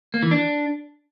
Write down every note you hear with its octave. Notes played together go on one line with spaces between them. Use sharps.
A#3
E3
D4